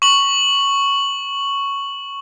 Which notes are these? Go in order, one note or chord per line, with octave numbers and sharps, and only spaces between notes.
C#6 F#7